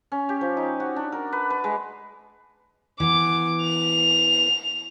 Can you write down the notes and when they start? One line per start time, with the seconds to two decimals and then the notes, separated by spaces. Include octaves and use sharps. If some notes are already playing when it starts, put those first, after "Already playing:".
0.12 C#4
0.29 G4
0.41 F3
0.57 D#4
0.80 F#4
0.96 D4
1.12 A#4
1.32 B4
1.50 B4
1.64 G#3
3.00 E3 B3 D6
3.62 F7